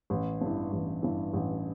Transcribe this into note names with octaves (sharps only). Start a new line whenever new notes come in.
A1
G2 E3
A1
G2 E3
A1